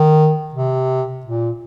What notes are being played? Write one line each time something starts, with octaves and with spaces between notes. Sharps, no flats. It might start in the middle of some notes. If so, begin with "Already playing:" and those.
Already playing: D#3
C3
A#2